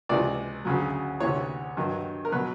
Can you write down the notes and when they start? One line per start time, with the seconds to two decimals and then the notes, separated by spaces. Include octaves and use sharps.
0.09 C#2 C3 E3 D5
0.65 D2 C#3 F#3
1.20 D2 C3 E3 C#5
1.77 G2 D#3 F#3
2.25 A#4
2.32 B2 F#3 B4